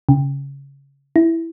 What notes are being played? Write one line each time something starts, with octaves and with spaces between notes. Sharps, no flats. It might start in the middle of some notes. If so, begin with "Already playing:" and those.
C#3
E4